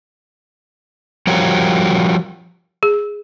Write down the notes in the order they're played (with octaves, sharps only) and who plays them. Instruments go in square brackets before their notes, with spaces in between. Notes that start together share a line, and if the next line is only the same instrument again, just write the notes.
[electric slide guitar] F3 G3 F#4 A#4 C#5
[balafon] G#4